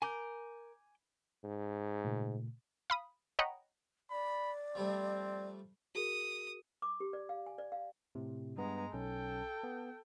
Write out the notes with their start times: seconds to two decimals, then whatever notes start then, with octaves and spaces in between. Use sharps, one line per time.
0.02 A#4 G#5 D6 G6
1.44 G#2
2.04 A#2 C#3 A3
2.90 F5 B5 D#6
3.39 C#5 D#5 F#5 G5 A#5 B5
4.11 D5 B5
4.75 F3 G3 A3 C4
5.95 F#4 G#4 A#4 D#6
6.82 D6
7.00 G4
7.13 D5
7.29 F5
7.46 G#5
7.58 D5
7.72 F5
8.15 A2 C3
8.58 G2 G#3 B3 A#5
8.94 B1 C#4 A4 G5
9.63 B3